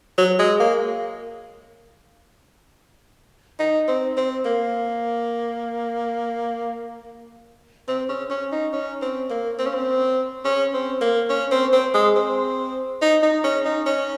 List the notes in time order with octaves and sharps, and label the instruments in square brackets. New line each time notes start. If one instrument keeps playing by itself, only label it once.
[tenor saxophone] F#3
G#3
A#3
D#4
C4
C4
A#3
C4
C#4
C#4
D#4
C#4
C4
A#3
C4
C#4
C4
C#4
C4
A#3
C#4
C4
C4
G#3
C4
D#4
D#4
C#4
D#4
C#4